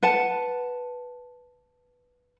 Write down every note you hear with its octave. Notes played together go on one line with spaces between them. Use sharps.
B4 F#5 A5